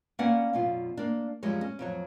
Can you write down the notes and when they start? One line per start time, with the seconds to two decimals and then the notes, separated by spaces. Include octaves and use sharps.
0.19 A#3 B3 C#4 D5 F#5
0.53 F#2 B2 F4
0.97 A#3 D4
1.43 F#2 F3 G3 G#3 C#5
1.61 C#4
1.79 F2 F#3 C#5